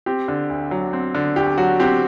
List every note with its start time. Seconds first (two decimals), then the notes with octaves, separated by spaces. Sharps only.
0.06 C4 G4
0.28 D3
0.50 D2
0.71 F#3
0.93 C4
1.15 D3
1.36 D2 G4
1.58 F#3 F#4
1.80 C4 G4